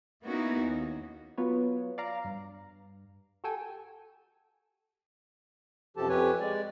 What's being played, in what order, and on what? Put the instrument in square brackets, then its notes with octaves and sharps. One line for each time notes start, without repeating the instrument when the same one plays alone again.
[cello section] A#3 B3 C#4 D#4 E4 F#4
D#2
[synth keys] F#3 B3 F4 B4 C#5
D5 F5 A#5
G2
F#4 G4 A4 G5 G#5
[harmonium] F#2 C3 F3 G4 A4 A5
F2 G4 B4 C#5 G#5
G#3 D5